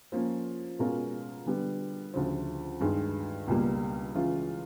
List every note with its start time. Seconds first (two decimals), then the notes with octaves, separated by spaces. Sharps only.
0.12 F3 A#3 C#4
0.79 B2 G#3 C#4 F4 A#4
1.46 D3 G3 B3
2.14 D2 C#3 F3
2.81 G2 D#3 G#3
3.48 C#2 B2 G3 A#3
4.15 C#3 E3 G#3 C#4 F4